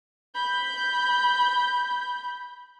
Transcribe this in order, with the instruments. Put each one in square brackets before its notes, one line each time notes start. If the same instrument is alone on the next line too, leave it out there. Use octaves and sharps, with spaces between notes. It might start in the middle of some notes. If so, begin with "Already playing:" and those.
[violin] B5 G6